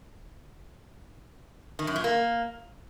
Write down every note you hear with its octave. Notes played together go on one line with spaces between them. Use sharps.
D#3
F#2
A#2
A#3